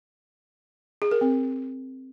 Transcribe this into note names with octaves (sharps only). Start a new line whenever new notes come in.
G#4
A#4
C4